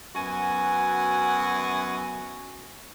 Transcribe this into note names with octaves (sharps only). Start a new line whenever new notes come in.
F#2 B3 F#4 G#5